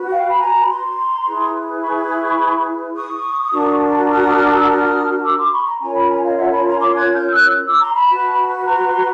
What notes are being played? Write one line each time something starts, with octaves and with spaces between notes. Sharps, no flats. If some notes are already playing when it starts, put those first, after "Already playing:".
Already playing: F#4 B4
F5 G5
B5
G#5 A#5
B5
A#5 C6
E4 G#4 B4
B5 C#6
C#6 D#6
D4 F#4 A#4
D#6 F6
E6
D#6 F6
D6 E6
C6 D6
B5 C#6
A#5 C6
C#4 F4 A#4 C#5 G#5 A#5
A5 B5
G#5 A#5
D#5 F5
E5 F#5
A5 B5
A#5 C6
C6 D6
F#6 G#6
F6 G6
E6 F#6
D6 E6
A#5 C6
A5 B5
F#4 B4
A#5 C6